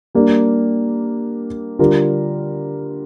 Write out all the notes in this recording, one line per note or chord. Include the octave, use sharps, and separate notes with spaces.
G3 A#3 D4
D3 G3 D4 F4 A#4